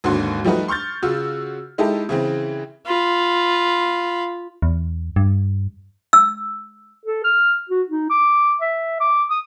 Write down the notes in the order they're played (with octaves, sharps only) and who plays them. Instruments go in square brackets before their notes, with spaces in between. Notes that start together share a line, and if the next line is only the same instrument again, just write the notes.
[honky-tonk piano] G#1 D#2 D3 F#4 C6
F3 G3 A3 D#4 F#4 B4
C6 C#6 F6 G6 A6
C#3 F4 F#4 E6
G#3 D#4 E4 G4 A4
C#3 E3 C4
[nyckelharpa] F4 B5
[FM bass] E2
G2
[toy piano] E6
[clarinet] A4
F6
F#4
D#4
D6
E5
D6
D#6